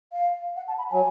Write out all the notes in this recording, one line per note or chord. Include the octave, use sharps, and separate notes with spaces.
F5
F#5
A5
B5
F#3 G#5